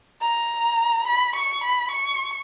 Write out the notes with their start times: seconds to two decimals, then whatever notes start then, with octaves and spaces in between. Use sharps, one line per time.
0.21 A#5
1.07 B5
1.35 C#6
1.64 B5
1.91 C#6